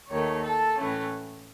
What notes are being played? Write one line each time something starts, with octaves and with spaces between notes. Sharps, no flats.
D#2 D#3 A3 C#5
A4
A2 E3 A3 C#4